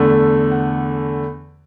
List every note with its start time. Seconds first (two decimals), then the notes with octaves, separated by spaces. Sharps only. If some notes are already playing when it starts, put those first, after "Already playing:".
Already playing: E2 D3 A3
0.51 F#5